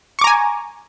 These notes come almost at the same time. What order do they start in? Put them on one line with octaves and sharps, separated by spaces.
C#6 D6 A#5 G#5